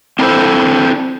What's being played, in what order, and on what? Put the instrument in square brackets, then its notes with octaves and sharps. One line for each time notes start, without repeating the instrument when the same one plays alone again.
[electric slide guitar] C4 D4 E4 A4 C5